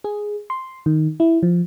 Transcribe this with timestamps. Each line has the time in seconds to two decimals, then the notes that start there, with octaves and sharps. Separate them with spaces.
0.04 G#4
0.50 C6
0.86 D#3
1.20 E4
1.43 F3